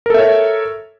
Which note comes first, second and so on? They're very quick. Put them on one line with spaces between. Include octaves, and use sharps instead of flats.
A#4 A4 E5 C#5